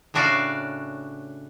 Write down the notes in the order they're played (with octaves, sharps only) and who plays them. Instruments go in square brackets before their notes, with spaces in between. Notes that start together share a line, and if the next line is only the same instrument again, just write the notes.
[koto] A2 C#3 D4 F#4 D5 F5